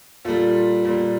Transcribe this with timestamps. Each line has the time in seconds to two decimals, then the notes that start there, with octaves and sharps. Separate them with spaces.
0.25 A#2 G3 F4 A4
0.84 A#2 G3